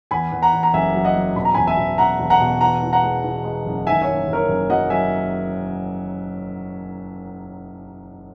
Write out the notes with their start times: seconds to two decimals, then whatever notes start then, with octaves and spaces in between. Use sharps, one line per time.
0.11 E2 G#5 B5
0.32 E2
0.42 F#5 A#5
0.53 E2
0.63 A#5
0.74 F#1 E5 G#5
0.94 F#3
1.05 D#5 F#5
1.15 F#3
1.36 E1 B5
1.45 A#5
1.54 E1 G#5 B5
1.67 E5 G#5
1.77 E1
1.98 E1 F#5 A#5
2.20 E1
2.30 F#5 A#5
2.40 B2
2.61 E3 F#5 A#5
2.83 E3
2.93 F#5 A#5
3.03 G#3
3.24 E3
3.44 G#3
3.66 F#1
3.87 D#3 E5 G#5
4.02 C#5 E5
4.08 F#1
4.28 F#1
4.33 A#4 C#5
4.49 F#1
4.70 F#3 D#5 F#5
4.90 F#3 E5 G#5